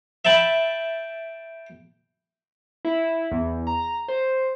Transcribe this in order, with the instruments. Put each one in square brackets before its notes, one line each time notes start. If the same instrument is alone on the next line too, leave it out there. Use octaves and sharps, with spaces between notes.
[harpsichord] E5 G5 A5 B5
[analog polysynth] E4
E2
A#5
C5